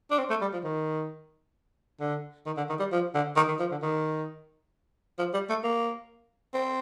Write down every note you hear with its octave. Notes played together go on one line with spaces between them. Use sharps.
D4
C4
A3
G3
F3
D#3
D3
D#3
D3
D#3
G3
F3
D3
D#3
D#3
F3
D3
D#3
F3
G3
A3
A#3
C4